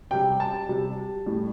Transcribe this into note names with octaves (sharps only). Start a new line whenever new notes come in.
C3 G3 G5
A5
C3 G3
A2 G3